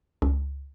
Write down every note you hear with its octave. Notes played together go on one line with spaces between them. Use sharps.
C#2